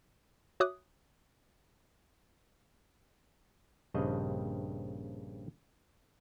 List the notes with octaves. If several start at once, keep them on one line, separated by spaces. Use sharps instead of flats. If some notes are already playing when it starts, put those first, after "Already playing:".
F#4 C#5 E5 D6 D#6 F#6
A#1 G2 C#3 C4 D#5